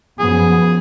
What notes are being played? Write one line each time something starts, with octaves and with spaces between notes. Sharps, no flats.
F#2 F3 B3 G#4